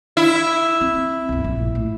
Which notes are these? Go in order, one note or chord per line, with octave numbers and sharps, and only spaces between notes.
E4
C4
G1 C2
A#1
A2